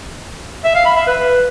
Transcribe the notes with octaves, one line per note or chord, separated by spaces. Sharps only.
E5
F5
B5
E5
B4